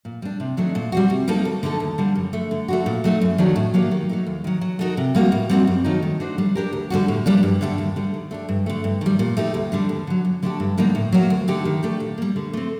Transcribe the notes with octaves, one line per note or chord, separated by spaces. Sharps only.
A#2
G3 D4
C3
D#3 F#3 A3 D4
A#2
G3 C4 F#4
C3
G3 A#3 D#4 A4
D2
D3 A3 D#4 A4
D#2
D3 G3 A#3
F#2
D3 A3
D3
A3 D4 F#4
A#2
F#3 A3 D#4
F#2
D#3 F#3 A3 D4
A2
F#3 A#3 D#4 G4
D#3
F#3 A3 D#4
D#2
D#3 F#3
F#3
A3 D#4 F#4 A#4
C3
G3 A#3 F#4
A2
G3 C4 D#4 F#4
F#2
D#3 F#3 A3 D#4
D#3
A3 D4 F#4 C5
G3
D4 G4 A#4
D2
D3 G3 D4 F#4
A2
G3 A#3 D4
G2
D3 A3 D4 G4
D#2
D3 G3
D#3
A3 D4 G4
G2
D3 A3
G2
D#3 G3
A#2
A3 D#4 G4
D2
D3 G3 D4
D#2
D3 F#3
F#2
D3 A3 D4 G4
G2
D3 G3 A#3 D#4
A2
F#3 A#3 F#4
D2
D3 A3 D#4 G4
D#3
A3 D4 G4 D5
A#2
G3 A#3
D3
A3 C4